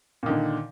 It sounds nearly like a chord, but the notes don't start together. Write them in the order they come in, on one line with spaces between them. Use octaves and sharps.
A#2 D#3 D3